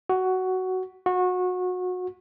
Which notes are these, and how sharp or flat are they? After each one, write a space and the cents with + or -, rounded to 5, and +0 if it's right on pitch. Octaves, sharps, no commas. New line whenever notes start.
F#4 +10
F#4 -25